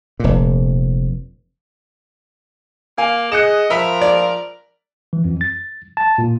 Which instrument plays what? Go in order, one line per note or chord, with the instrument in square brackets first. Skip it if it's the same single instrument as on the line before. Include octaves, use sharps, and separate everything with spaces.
[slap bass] F1 A#2
[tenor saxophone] A#3 [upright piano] F5 G#5
[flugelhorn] G#4 [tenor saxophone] D#5 [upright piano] F#6 C#7 E7
[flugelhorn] F3 [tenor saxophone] A#4 [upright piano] E5 B5 B6
[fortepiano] D5
[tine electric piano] E3
F2
A6
A5
A#2